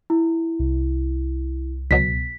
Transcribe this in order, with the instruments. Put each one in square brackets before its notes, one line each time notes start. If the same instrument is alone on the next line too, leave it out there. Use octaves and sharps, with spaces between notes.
[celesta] E4
[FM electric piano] C2
[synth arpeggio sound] C#2 B2 F#3 [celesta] B6